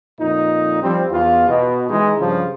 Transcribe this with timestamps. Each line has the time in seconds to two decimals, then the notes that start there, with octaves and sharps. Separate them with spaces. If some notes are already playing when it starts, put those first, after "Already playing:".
0.19 F2 A#2 D#4
0.82 F3 G3 C4
1.10 E2 F4
1.48 B2
1.89 E3 G#3 D#4
2.19 G2 C#3 F3